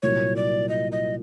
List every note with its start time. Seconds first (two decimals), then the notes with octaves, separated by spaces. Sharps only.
0.03 C2 A#2 F#3 C#5
0.36 D5
0.69 D#5
0.92 D#5